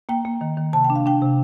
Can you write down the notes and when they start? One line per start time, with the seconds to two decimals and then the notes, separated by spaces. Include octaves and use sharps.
0.09 A#3 G5
0.25 A#3
0.41 D#3
0.57 D#3
0.73 C3 A5
0.84 G5
0.90 D4
0.95 F5
1.06 D4 G5
1.22 C3